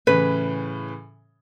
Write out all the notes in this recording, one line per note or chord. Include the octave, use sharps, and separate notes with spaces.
A2 C#3 E3 B4